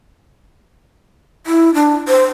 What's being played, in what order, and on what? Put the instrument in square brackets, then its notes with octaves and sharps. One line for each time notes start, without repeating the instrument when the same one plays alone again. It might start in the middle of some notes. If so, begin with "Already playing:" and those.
[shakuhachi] E4
D4
C5